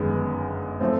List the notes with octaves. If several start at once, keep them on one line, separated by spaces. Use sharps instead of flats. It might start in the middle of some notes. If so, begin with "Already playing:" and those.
Already playing: G1 F#2 D#3 G#3 B3
F3 A3 C4